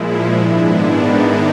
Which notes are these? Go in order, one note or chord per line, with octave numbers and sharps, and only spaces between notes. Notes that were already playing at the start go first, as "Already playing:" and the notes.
Already playing: A#2 F3 G#3 E4
G#2 D#3 G#3 B3 D4
D#4